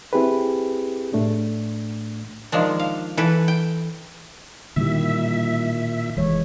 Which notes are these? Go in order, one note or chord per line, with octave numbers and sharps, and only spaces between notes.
C4 E4 G4 G#4 B4
A2 A3 D4
D#3 F3 G#3 D4
F5
E3 A4 B4
G5
A#2 D3 D#3 G3 A#3 E4 G4 E5
F1 E3 G#3 C#5